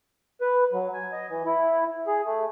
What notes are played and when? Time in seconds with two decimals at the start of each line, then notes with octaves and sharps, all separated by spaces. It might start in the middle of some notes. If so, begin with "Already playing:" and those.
0.41 B4
0.72 F#3
0.94 G#5
1.12 D#5
1.29 E3
1.45 E4
2.07 G#4
2.25 A3